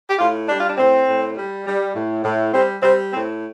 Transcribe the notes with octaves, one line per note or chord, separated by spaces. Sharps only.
G4
A2 F4
G3 D4
F4
D4
A2 C4
A2
G3
G3
A2
A2
G3 C4
G3 C4
A2 C4